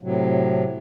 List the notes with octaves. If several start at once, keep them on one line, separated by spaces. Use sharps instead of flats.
A2 C3 F#3